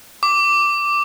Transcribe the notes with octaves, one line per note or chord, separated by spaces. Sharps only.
D6